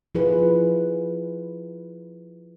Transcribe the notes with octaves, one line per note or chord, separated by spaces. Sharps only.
F3 E4 F4 G#4 B4